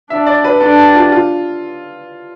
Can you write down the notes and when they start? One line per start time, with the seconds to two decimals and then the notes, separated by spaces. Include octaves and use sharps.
0.10 D4 E5
0.27 D5
0.44 B4
0.61 D4 A4
0.78 G4
0.95 F4
1.12 F4